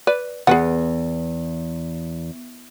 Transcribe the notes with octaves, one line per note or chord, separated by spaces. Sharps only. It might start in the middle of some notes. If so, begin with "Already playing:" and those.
B4 D5
E2 G#4 B4 F#5